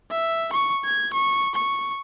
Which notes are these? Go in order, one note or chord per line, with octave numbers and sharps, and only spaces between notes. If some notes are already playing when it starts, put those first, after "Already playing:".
E5
C#6
G#6
C#6
C#6